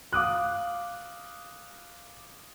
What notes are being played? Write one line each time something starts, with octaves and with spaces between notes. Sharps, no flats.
F5 D6 D#6 F#6